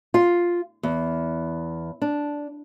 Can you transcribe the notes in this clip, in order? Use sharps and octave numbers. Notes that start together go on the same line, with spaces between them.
F4
E2
D4